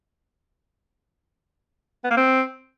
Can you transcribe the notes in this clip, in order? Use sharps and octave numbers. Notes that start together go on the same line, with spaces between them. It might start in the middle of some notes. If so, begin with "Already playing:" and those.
B3
A#3
C4